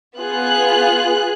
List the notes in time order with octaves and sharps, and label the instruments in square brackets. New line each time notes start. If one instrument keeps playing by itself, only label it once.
[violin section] B3 F4 G#4 F#6